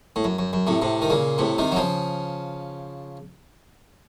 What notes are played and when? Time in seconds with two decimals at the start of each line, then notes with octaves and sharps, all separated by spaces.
0.16 A2
0.24 F#2
0.39 F#2
0.53 F#2
0.67 A2 C3
0.81 A2 C3
1.02 D#3
1.10 A#2 C#3
1.38 A2 C3
1.58 C3 D#3
1.72 F#3
1.76 C#3 F3